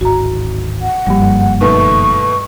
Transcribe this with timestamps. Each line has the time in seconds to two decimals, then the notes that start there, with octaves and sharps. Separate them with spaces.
0.01 D1 G#1 F#4 A#5
0.82 F#5
1.07 F#1 G2 F3 G3 A#3
1.61 B2 D#3 A3 C#6